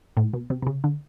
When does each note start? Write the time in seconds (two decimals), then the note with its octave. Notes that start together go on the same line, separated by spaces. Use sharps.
0.17 A2
0.33 B2
0.50 C3
0.62 C3
0.67 C#3
0.84 D3